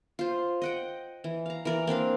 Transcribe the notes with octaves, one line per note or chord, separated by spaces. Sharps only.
F4 C5
D#5 F#5 G5
E3
F5 A#5
E3 A#4 D5
A#3 C4 D4 F5